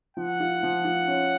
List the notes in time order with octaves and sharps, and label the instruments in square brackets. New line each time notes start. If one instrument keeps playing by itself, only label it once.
[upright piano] F3 [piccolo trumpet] F#5
[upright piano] F4
F3
F4
C#4